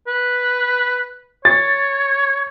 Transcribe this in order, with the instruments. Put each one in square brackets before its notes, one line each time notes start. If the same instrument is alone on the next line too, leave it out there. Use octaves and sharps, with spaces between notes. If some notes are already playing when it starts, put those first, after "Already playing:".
[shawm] B4
[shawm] C#5 [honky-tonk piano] A6